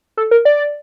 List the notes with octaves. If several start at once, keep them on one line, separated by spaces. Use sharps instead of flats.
A4
A#4
D5